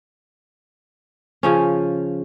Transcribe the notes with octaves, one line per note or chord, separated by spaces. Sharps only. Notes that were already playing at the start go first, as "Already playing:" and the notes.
C#3 F3 C#4